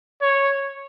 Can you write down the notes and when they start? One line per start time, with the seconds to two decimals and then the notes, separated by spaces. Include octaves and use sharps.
0.22 C#5